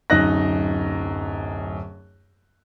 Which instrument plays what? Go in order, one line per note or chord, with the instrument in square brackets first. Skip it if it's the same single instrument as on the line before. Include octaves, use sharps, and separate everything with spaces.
[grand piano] D1 F#2 D#4 D#5 F#6 A#6